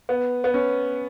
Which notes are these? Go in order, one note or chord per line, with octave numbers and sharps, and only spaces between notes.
B3
B3
C#4